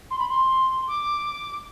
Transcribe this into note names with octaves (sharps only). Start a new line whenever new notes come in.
C6
B5
C6
D6